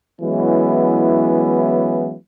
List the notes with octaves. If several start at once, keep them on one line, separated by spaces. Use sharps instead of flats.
E3 F#3 G#3 B3 C#4 E4